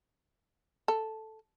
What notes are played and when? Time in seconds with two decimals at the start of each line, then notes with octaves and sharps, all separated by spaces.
0.88 A4